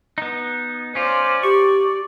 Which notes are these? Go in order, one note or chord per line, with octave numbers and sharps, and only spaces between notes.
B3 D#4
C#4 F4 C5 D5
G4 D5 C#6